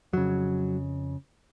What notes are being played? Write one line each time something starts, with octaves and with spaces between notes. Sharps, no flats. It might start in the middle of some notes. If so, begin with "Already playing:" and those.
F2 C#3 F#3